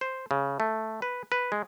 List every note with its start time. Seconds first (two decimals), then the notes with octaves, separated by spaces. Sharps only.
0.01 C5
0.31 C#3
0.60 A3
1.02 B4
1.32 B4
1.52 G#3